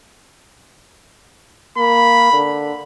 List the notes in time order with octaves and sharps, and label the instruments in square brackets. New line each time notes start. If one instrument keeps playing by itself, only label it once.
[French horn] A#3 [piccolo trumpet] B5
[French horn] D3